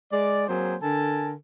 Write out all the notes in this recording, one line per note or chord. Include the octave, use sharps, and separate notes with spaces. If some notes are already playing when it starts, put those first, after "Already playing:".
G#3 D5
F#3 A#3 C4 G#4 C5
D3 A4 A#4 G#5 A5